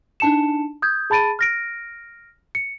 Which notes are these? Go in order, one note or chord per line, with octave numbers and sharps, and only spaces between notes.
D4 D#4 A5 C#7 E7
D#6 G6 G#6
G#4 A5 B5 A6 D7 D#7
F6 A#6 D7
C#7